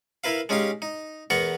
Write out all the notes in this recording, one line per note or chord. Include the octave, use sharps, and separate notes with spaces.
E4 A#4 B4 F5
G#3 C#4 D#4 G4 F5
D#4
E2 B3 A#4 F#5 A#5 C#6